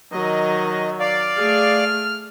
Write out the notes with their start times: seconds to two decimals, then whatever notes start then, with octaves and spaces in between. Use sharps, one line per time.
0.13 D#3 F#3 D#5
1.00 D5 F5
1.38 A3 G#4 F6